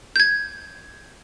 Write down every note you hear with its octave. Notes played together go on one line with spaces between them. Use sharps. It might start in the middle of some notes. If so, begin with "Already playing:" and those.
G6 G#6